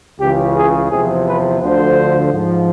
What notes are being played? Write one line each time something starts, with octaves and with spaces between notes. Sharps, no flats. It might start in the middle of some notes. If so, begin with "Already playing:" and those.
C#2 C#3 E3 G4
G#4
E2 C3 F3 G#4
B4
D2 D3 F3 C5
G#2 F3